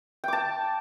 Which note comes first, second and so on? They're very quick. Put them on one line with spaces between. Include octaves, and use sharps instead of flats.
G5 D6 A5